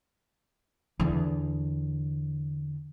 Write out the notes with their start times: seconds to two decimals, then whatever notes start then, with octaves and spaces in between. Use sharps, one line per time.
1.00 E2 D3